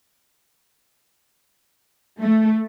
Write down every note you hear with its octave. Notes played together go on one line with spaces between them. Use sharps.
A3